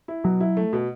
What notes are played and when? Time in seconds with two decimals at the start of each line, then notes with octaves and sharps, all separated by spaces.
0.08 E4
0.24 B2 F#3
0.40 E4
0.57 A3
0.73 B2